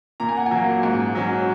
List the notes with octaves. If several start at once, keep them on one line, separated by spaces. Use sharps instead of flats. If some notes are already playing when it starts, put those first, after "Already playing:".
A#2 A#5
G#5
F#5
G#5
F#3 A#3
G#2
F#3 C#4